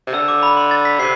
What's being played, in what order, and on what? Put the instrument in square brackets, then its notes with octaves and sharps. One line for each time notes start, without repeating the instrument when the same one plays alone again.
[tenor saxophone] C3
[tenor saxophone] D3 [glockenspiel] E6
[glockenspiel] D6
B5
C6
A6
B6
[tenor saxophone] C3 [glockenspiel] C7